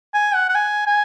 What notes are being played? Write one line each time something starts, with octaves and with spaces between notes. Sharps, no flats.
G#5
F#5
F#5
G#5
G#5